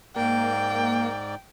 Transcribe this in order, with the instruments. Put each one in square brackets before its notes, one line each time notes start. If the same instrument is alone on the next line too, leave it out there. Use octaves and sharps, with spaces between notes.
[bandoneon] G#2 D5 [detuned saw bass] A#3 [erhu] G5